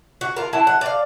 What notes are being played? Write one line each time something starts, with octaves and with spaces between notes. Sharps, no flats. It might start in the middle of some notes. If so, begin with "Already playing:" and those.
F#4
F4 A#4
F#3 E4 A5
F#5
D5 F5